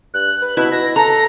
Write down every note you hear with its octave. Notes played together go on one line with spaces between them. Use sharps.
G2 F#6
B4
B2 E4
B2 A#6
A4 A#5 A#6